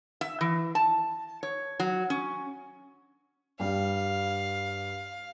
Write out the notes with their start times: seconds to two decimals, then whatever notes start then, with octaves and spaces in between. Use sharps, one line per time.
0.21 E5
0.41 E3
0.75 A5
1.43 C#5
1.80 F#3
2.10 C#4
3.60 G2 G3 F5